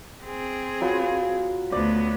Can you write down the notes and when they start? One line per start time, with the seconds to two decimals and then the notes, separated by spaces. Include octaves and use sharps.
0.24 C4 G#4
0.81 F#3 F4 B4
1.72 D2 B3 C5 D5